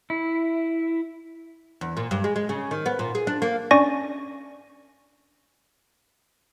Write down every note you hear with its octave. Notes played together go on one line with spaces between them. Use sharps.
E4
E2
A#2
G2
G#3
G#3
C#3
D#3
B3
A#2
G#4
D4
A#3
C#4 D4 D5 G#5 C#6 A#6